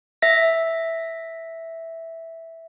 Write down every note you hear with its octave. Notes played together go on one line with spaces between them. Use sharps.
E5 A#6